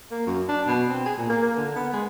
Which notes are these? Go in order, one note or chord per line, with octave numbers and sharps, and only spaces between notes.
A#3
F#2
D4
B2
C4
G#4
A#2
A#3
A#3
D3
B3
G#3